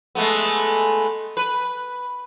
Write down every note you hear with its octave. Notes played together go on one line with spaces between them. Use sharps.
G#3 A3 B3
B4